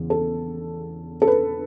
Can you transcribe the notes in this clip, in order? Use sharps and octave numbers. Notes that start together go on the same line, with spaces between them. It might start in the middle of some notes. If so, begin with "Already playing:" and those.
Already playing: E2 C#3
A4
A4
B4